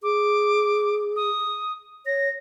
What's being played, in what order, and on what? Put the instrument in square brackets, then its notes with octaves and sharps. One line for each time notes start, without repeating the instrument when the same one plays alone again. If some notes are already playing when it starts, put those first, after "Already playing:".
[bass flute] G#4 [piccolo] D6
[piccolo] D#6
[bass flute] C#5 [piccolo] A#6